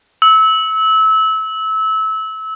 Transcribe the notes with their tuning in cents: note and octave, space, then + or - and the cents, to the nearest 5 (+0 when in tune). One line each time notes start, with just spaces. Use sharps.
E6 -25